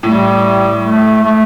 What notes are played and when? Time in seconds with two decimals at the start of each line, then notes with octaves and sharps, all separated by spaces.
0.03 A2 G3
0.83 A3
1.24 A3